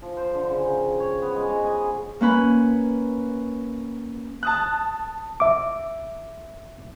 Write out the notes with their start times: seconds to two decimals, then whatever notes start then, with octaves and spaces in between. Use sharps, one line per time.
0.02 F3
0.17 C5
0.35 D3
0.50 C#3
0.73 G5
1.00 C#5
1.22 B3
1.35 G#3
1.49 D#5
1.64 G#5
1.77 G#4
2.21 A#3 C#4 B4 B5
4.43 A5 D#6 F#6
5.40 E5 D6